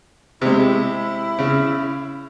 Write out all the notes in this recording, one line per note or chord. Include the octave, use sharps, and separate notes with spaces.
C3 G#3 E4
C#3